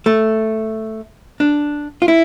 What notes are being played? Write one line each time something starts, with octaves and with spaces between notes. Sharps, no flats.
A3
D4
F4
E4